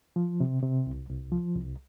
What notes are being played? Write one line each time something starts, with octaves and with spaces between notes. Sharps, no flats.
F3
C3
C3
C2
C2
F3
C2